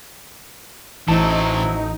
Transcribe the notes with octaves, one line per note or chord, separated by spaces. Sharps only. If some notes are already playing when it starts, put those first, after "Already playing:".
A1 A2 E3 F#3 C4 D#4 E4 A5